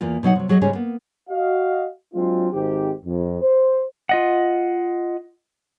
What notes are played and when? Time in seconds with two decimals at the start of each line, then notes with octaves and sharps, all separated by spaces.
0.01 E2 E3 A#3 F4
0.23 B2 F#3 D#4 F#5
0.35 C3 F#3
0.49 F#3 G#4 C#5 D#5
0.61 G#2 C#3 G3 C#4 G#4
0.73 A#3 B3
1.30 F#4 D#5 F5
2.14 F#3 G#3 C4 D4 F4
2.53 G#1 D#3 G#3 C4 D#4 G4
3.05 F2
3.42 C5
4.09 F4 D#5 F#5